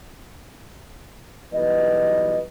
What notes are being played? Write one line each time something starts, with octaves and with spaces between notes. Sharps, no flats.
B1 E3 G3 B3 B4 D#5